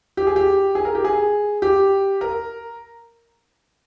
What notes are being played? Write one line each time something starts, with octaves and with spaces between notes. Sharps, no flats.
G4
G#4
G4
G#4
A#4
G4
G#4
G4
A#4